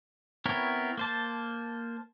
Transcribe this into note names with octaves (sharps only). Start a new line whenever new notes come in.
B3 C4 E4 A#4 C#5
A#3 C5 A5